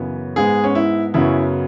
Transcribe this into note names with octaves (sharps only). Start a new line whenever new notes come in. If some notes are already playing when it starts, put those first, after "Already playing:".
Already playing: F#2 C#3 E3 B3
G#2 G#3 B3 G#4
C#4
E4
F#2 C#3 F#3 B3 E4